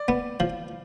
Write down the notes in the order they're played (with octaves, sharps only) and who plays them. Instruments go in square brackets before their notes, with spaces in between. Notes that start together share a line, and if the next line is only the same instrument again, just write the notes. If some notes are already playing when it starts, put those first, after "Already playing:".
Already playing: [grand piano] D5
[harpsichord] B3
F3